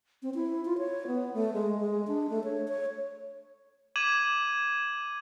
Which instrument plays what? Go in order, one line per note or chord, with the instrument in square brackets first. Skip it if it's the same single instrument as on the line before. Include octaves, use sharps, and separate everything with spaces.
[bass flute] C4
E4
F4
C#5
B3
A3
G#3
G#3
D4
A3
C#5
C#5
[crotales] D6 G#6 D#7 E7 F#7